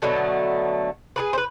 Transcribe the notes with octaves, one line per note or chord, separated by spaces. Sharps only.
B2 D3 F#3 A3
G#4 A#4 B4
B4 C5